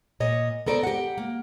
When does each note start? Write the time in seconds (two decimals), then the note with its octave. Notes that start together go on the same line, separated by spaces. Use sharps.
0.20 A#2 C#5 D#5
0.66 B3 A4 A#4 C5 D5
0.83 G4 F#5
1.18 A#3